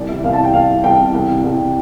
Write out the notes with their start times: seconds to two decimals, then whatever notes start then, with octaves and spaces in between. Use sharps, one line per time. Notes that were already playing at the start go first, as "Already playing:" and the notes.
Already playing: C2 D5
0.08 C3 E3 E5
0.24 C2 F5
0.33 A5
0.38 C3 E3
0.44 G5
0.53 C2 F5
0.69 C3 E3
0.84 C2 G5
0.99 C3 E3
1.14 C2
1.29 C3 E3
1.44 C2
1.59 C3 E3